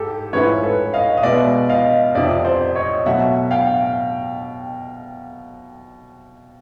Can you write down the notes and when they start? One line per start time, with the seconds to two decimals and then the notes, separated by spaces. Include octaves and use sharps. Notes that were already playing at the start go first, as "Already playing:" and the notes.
Already playing: G#2 G4 A4
0.33 G#2 F3 A3 C#4 E4 B4 C#5
0.63 A4 B4
0.94 D#5 F5
1.17 D#5
1.23 B2 G#3 B3 D5 E5
1.69 D#5 F5
2.15 F2 C3 F3 D5 E5
2.45 C5 D5
2.75 C#5 D#5
3.06 B2 F#3 A3 E5 F#5
3.51 F5 G5